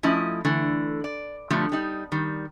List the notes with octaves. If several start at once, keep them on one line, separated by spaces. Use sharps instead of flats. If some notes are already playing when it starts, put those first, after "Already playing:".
F3 A3 C#4 E4 D#5
D3 E3 A3
D5
B2 D3 F3 G3 A3
G3 D#4
D#3 G3